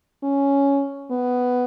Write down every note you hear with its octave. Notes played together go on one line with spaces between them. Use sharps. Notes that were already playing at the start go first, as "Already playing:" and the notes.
C#4
B3